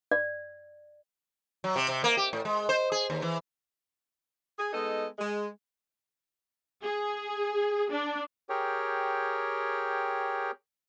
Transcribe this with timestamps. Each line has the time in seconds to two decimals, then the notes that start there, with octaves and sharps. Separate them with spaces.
0.12 D5
1.64 F#3
1.76 C3
1.89 C3
2.04 A#3
2.17 G4
2.33 A2
2.45 G#3
2.69 C5
2.92 G#4
3.10 D#2
3.22 E3
4.58 G#4
4.73 G#3 B3 D#4 A4 D#5
5.18 G#3
6.83 G#4
7.91 D4
8.49 G4 G#4 A#4 C#5 G5